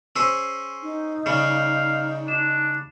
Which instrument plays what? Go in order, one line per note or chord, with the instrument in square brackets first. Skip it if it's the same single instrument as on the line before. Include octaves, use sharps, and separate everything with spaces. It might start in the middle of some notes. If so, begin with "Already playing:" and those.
[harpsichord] C#4 G#4 C5 [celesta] E6
[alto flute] D#4
[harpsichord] C#3 G3 [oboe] F5
[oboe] D4 [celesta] E7